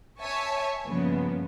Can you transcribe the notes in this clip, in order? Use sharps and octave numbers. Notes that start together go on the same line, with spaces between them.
C#5 E5 G#5 A5 C#6
G2 A#2 C#3 F3 B3